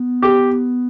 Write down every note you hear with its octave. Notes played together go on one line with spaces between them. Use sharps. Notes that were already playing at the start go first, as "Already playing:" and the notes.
Already playing: B3
G4